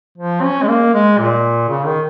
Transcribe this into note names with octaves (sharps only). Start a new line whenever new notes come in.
F3
C#4
G#3
A#3
G#3
A#2
C#3
D#3